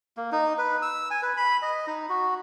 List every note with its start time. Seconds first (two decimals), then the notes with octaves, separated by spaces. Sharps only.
0.17 A#3
0.32 D#4
0.58 B4
0.82 E6
1.11 G#5
1.23 B4
1.37 B5
1.62 D#5
1.87 D#4
2.09 F#4